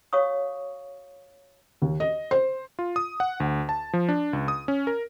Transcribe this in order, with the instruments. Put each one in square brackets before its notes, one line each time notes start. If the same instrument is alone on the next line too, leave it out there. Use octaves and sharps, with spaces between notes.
[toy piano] F#4 C#5 F5 C#6 D#6
[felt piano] D#2
D#5
C5
[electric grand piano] F4
D#6
F#5
D2
A5
F3
D4
C#2
D#6
C#4
A#4